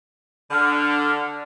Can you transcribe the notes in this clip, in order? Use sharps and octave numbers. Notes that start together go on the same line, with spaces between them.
D3 F6